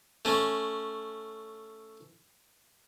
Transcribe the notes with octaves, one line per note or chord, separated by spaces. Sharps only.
A3 C#4